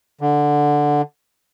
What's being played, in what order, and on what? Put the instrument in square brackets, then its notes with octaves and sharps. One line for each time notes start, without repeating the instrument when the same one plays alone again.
[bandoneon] D3